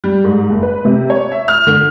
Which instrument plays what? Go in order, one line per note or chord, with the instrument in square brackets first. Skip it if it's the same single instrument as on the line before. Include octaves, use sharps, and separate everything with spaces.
[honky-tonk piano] G3
G#2
F#1
B4
C3
C#5
E5
F6
D3